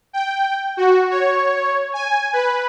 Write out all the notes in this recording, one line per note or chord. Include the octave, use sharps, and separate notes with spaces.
G5
F#4
C#5
G#5
B4